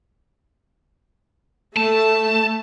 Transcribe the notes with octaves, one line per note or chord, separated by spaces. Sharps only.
A3 A5